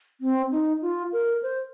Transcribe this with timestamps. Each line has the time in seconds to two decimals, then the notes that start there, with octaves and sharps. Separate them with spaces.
0.21 C4
0.52 D#4
0.82 F4
1.12 A#4
1.43 C5